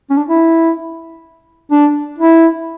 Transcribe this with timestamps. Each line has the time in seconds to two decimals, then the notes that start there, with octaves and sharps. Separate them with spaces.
0.10 C#4
0.17 D4
0.28 E4
1.71 D4
2.19 E4